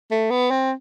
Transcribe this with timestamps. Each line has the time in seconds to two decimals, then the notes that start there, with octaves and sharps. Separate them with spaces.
0.11 A3
0.30 B3
0.50 C4